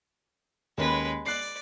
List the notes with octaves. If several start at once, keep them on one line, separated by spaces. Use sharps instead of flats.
D#2 G#3 C#4 B4 B5
D5 F#6 C7